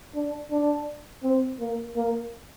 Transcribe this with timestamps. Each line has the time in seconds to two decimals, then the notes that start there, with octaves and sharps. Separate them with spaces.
0.15 D4
0.51 D4
1.23 C4
1.60 A#3
1.96 A#3